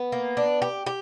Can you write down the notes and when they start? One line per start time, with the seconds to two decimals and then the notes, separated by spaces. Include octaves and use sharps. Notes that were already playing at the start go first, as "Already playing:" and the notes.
Already playing: B3
0.12 A#3
0.37 D4
0.62 G4
0.86 G4